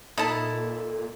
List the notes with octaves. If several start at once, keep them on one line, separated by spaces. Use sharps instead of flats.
A#2 D#4 E4 A4 A5